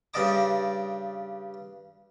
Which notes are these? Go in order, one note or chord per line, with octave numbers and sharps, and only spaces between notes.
G2 C#3 D5 D#5 A5 D6